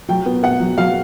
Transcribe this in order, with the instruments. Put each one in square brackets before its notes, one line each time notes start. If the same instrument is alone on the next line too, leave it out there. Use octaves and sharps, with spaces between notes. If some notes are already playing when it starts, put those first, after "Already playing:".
[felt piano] F#3 [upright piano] G5
[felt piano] B3
[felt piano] B3 [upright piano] F#5
[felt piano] F#3
[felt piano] F#3 [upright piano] F5